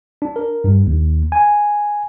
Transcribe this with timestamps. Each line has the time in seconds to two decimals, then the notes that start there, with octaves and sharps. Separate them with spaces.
0.22 D4
0.36 A#4
0.64 G2
0.87 D#2
1.32 G#5